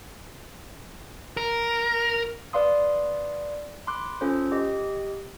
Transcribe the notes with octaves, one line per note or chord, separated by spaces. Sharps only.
A#4
B4 D5 F5 C6 D#6
B5 C6 D6 F#6
C#4 F4 A4 C5
G4 D#5